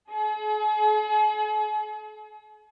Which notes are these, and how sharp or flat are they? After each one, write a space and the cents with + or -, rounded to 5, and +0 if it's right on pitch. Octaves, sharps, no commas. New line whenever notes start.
G#4 +45